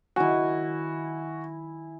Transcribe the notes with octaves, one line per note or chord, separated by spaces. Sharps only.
D#3 F#3 E4 F#4 G#5